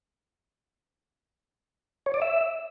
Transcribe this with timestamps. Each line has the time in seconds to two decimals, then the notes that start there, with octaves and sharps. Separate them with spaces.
2.06 C#5
2.14 D5
2.22 E5